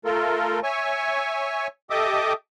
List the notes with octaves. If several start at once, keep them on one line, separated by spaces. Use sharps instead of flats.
A3 F4 A4 A#4
C#5 E5 G#5 C#6
G4 A4 D#5 E5 D6 D#6